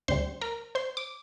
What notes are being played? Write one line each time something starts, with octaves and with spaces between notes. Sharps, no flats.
D2 D3 G3 C5 C6
A#4 A#5
C5 C6
D6